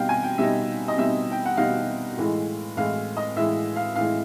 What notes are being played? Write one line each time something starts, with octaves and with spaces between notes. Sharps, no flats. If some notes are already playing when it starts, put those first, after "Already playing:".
Already playing: B2 G3 C4 D#4 F5 G5
G#5
G5
B2 G3 C4 D#4 E5
D#5
B2 G3 C4 D#4 E5
G5
F#5
B2 G3 C4 D#4 F5
A2 E3 G#3
A2 E3 G#3 F5
D#5
A2 E3 G#3 E5
F5
A2 E3 G#3 F5